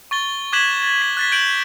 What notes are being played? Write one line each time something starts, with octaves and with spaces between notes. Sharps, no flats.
C#6 A6 G7
D6 F#6 G#6 B6 E7 F#7
A6
B6
F#6 A6 B6
G6 D7 F#7